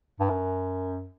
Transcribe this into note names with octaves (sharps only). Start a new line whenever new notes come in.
G2
F#2